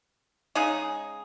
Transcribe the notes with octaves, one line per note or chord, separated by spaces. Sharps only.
C#3 G#3 D#4 G#4